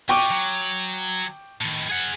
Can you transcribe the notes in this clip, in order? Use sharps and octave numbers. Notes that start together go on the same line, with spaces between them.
F#4 D#5 G5 C#6 D6
F#3
A2 D#3
G#4 F#5